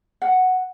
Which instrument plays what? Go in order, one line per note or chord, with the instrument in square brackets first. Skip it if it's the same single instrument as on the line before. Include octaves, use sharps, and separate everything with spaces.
[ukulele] F#5